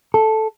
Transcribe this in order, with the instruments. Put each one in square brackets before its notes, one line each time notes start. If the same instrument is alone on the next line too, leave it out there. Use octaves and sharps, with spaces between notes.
[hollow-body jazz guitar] A4